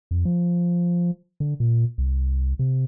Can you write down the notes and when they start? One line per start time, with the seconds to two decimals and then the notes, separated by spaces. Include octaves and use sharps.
0.11 F2
0.25 F3
1.40 D3
1.60 A#2
1.98 C2
2.59 C3